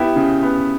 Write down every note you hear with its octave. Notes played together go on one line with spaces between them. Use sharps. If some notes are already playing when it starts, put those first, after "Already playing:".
Already playing: B3 E4 G4
C#3
B3